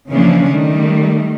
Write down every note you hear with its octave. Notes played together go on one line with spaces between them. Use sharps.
C#3 E3 F3 A#3 C#4 D4
D#3 G3 A3